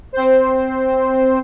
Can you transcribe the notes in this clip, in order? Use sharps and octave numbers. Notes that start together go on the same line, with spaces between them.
C4 C5